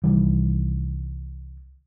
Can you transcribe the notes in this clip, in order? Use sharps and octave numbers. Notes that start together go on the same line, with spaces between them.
C2 D#3 E3 G3